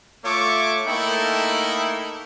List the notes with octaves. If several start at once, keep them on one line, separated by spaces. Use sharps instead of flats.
A3 F4 C#5 E5 C#6 D6
A3 A#3 D#4 E4 A4 G5